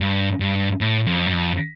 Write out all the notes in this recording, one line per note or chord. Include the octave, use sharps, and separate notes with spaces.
G2
G2
A2
F2
F#2
F2